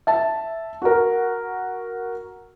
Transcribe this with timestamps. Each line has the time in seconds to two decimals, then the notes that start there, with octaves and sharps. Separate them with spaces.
0.07 E5 A5
0.82 F#4 A#4